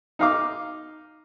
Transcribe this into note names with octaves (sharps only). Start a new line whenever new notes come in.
D#4 F5 D6